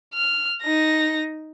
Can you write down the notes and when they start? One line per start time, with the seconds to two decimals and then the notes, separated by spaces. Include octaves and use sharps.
0.14 F6
0.62 D#4 A#6